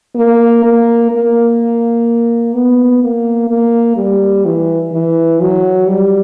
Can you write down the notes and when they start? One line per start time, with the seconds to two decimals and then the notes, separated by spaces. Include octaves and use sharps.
0.16 A#3
0.64 A#3
1.12 A#3
2.54 B3
3.02 A#3
3.49 A#3
3.97 G3
4.45 E3
4.92 E3
5.41 F#3
5.87 G3